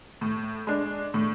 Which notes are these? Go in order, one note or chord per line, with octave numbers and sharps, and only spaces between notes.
A2
G#3 D4
A2